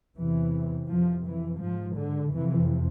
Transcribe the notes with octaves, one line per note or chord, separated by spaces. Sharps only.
E2 C3 E3
F2 C3 F3
E3
G#2 F3
D3
F2 C3 E3